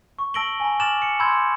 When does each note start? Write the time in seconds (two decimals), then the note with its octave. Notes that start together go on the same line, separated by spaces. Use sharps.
0.19 C#6
0.34 A5 E6 A#6 D7 F#7 G7
0.60 G#5 A#5
0.80 A#5 D6 F6 A6 E7 F#7
1.02 C#7
1.20 B5 C6 D6 E6 G6 G#6